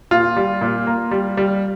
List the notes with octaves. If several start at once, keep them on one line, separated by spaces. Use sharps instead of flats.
A#2 F4
G3
A#2
A#3
G3
G3